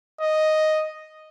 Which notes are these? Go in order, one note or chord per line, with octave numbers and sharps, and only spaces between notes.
D#5